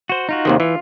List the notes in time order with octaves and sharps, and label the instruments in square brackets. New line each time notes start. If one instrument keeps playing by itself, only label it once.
[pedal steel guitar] F#4 C5
D#4 F4 F#4
[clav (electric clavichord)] D#2 C3 D#3
[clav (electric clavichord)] E3 [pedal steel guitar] F4